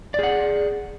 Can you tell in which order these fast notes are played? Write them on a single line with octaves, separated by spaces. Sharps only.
D5 G#4 F#5